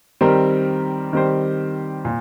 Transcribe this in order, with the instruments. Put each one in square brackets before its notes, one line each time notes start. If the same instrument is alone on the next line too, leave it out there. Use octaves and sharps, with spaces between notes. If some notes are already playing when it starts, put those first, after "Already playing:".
[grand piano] D#3 G3 C4 G4 A#4
D#3 G3 C4 G4 C5
A#2